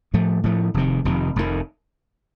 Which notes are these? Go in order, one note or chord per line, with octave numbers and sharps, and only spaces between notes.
A2 F3 A3
A2 F3 A3
F1 F2 C3 D#3
F1 F2 C3 D#3
F1 F2 C3 D#3